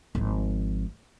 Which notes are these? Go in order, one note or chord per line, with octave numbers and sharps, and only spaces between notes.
G#1 F3